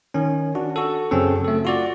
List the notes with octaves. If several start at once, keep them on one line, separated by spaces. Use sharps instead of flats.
D#3 C#4
D4 F#4
F#4 A4
F#2 C#3 C4 C#4 A4
A3 A4
F4 F#4 D5